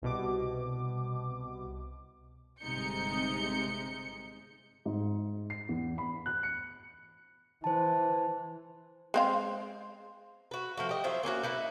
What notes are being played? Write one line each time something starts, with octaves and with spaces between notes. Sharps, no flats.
C2 B2 D6
G1 C3 G#3 D#4 G6 C#7
G#2
C7
E2
B5
F#6
C#7
E3 C5 A5
G#3 C4 F5
F#4 B4
F3 A3 F#4
G4 D#5
F#3 F4 C5 E5
A#3 C#4 E4 F#4
D#4 E4 B4